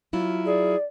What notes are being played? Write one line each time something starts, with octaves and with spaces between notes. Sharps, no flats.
F#3 E4 F4
G#4 D5